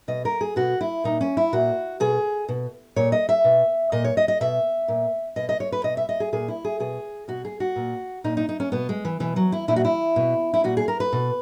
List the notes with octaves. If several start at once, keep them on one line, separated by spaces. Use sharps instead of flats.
B2 D#5
A#4
G#4
B2 F#4
E4
A#2 D#4
C#4
E4
A#2 F#4
B2 G#4
B2
A#2 C#5
D#5
E5
B2
A#2 D#5
C#5
D#5
D#5
B2 E5
A#2
B2 D#5
D#5
C#5
B4
B2 D#5
E5
D#5
G#4
A#2 G#4
E4
G#4
B2 G#4
B2 F#4
G#4
F#4
A#2
A#2 D#4
D#4
D#4
C#4
B2 B3
G#3
E3
B2 E3
F#3
E4
A#2 E4
F#4
E4
B2
E4
A#2 F#4
G#4
A#4
B4
B2